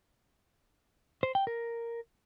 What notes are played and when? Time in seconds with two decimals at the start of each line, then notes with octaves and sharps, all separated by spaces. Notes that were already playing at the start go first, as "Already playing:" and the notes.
1.23 C5
1.35 G5
1.47 A#4